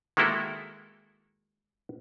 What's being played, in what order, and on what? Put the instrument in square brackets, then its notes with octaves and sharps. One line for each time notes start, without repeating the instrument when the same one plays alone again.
[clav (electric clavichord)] D#3 G#3 A#3 E4 F#4 A4